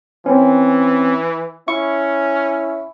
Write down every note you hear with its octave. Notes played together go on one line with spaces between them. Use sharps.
E3 C4 C#4
C#4 E4 C#6